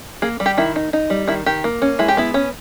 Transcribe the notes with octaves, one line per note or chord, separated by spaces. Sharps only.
A#3 G#4
G3
G4
D#3 E4
D#4
D#4
G3
D#3 E4
D#3 G4
A#3
C#4
G#3 E4
G4
B3 E4
C#4